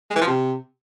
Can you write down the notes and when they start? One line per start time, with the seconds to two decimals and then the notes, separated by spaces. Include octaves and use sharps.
0.11 G#3
0.16 E3
0.21 F3
0.27 C3